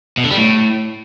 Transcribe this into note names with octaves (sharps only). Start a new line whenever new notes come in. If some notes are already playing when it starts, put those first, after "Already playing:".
B2
D3
G3
A2